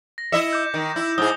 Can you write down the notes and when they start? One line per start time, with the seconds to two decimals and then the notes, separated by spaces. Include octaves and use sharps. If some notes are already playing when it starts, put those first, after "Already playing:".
0.18 A#6
0.32 E4 D#5 E5 C#7 E7
0.53 D6 G6
0.74 D#3
0.96 E4
1.18 G#2 G#4 D#6 G7